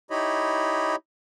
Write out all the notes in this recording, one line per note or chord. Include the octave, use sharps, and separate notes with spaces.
D#4 E4 G4 C#5 D#5 B5